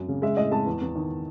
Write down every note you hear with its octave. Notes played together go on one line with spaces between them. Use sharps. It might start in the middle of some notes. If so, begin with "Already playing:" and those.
Already playing: F#2
C#3
G#3 E5
A2 D#5
G#3 A5
E2
E2
D#3